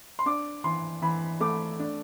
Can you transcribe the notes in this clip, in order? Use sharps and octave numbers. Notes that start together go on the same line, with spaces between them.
C6
D4 D6
E3 C6
E3 B5
A3 D6
D4